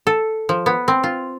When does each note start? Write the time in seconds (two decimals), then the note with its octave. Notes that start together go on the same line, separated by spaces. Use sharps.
0.07 A4
0.49 F3
0.66 B3
0.88 C4
1.04 F4